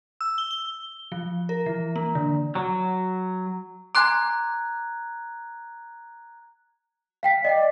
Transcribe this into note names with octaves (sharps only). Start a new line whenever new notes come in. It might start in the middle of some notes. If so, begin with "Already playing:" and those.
E6
G7
G7
F3
A#4
E3
A#3
D3
F#3
G#5 A#5 C6 D6 F#6 G#6
F5 G5 B6
D5 D#5 G5